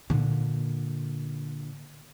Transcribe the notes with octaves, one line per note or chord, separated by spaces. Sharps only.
A#2 D3